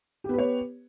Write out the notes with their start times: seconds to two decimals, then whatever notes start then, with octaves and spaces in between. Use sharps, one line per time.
0.24 G4
0.29 B3
0.34 B4
0.38 C#5